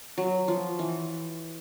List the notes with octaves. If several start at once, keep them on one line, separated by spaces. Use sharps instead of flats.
F#3
F3
E3